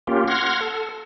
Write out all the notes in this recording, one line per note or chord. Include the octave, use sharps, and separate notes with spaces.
A#3 C#4 F4 G4
F#5 C6 F6 G#6 A#6
A4